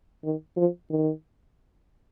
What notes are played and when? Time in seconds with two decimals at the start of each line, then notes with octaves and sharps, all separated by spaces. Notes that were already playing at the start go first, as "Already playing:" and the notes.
0.24 D#3
0.57 F3
0.90 D#3